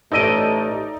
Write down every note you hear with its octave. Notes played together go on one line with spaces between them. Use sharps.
A1 A3 D#4 D5 D#5 G5 E6